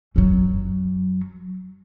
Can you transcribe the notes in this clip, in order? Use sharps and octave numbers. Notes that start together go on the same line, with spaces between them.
F#2 F#3